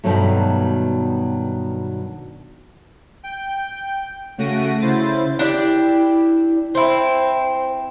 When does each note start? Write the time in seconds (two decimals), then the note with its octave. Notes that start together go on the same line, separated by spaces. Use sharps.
0.04 G2 B2 D#3 F#3 A3
3.23 G5
4.38 C#3 A3 F#4 A#6 D7 D#7
4.81 C#3 E4 C5 A6
5.39 D4 E4 G4 D5
6.75 C4 E4 C5